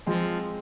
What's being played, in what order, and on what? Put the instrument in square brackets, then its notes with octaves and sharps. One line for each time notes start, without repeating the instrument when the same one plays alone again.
[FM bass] F3 [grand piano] G#3 C4